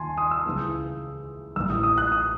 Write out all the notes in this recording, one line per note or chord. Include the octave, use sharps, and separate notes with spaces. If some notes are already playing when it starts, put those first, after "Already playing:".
Already playing: D#2 G#5 A5 C6
D#6
E6
C#2 C#3 E3
A1 A2 E3 E6
D#6
D#6
F#6
D#6